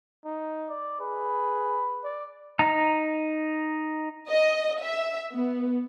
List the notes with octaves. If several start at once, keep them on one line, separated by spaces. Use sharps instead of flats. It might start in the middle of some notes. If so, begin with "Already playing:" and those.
D#4
D5
G#4 B4
D5
D#4 A#5
D#5
E5
B3